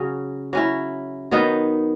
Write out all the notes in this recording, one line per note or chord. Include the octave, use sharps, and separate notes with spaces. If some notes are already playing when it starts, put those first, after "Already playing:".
Already playing: C#3 F#3 C#4 F#4
F#3 C#4 E4
D#3 F#3 B3 D#4